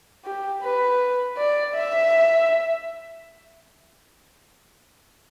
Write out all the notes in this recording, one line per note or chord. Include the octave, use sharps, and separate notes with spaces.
G4
B4
D5
E5